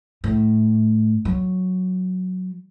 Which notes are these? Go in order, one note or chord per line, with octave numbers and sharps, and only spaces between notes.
A2
F#3